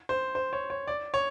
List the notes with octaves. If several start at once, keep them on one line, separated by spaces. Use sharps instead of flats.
C5
C5
C#5
C#5
D5
C#5